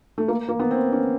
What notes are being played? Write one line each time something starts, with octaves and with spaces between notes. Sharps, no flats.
A3
A#3
A#3
B3
C4
C#4